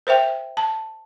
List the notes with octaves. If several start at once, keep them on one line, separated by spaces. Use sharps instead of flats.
A#4 C5 E5 G5
A5